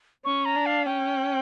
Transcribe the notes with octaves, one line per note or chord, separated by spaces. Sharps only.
C#4 C#6
A#5
D4
F5
C#4 G5